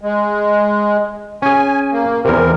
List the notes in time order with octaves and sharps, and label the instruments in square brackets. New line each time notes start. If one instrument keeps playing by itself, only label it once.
[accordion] G#3
[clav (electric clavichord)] C#4 G#4 [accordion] G#5
[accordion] A#3
[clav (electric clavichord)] E2 C3 [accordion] A#4